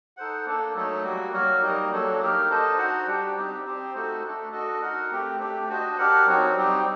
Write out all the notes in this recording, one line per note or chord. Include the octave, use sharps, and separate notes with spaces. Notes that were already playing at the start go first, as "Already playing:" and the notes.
D#4 A4 C5 F#5
A#3 D4 A4
F#3 A3 D#4 A4
G3 A#3 F#4
F#3 A#3 F#4 A#4
G3 A#3 D#4
F#3 A#3 D4 A4
A#3 D#4 G4 A#4
D4 A4 C5 D#5
D#4 F#4 C5 F#5
G3 D4 G4
C4 D#4 G4
C4 G4 C5
A3 D#4 F#4 A4
A3 D4 A4
D4 F#4 A4 D#5
D#4 F#4 A#4 F#5
A3 C4 G4
A3 D4 G4
D4 F#4 C5 D#5
D4 G4 A#4 F#5
F#3 C4 D#4 F#4
G3 C4 D#4 G4